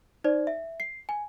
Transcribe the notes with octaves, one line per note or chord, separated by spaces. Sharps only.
D#4 C5 D5
E5
C7
G#5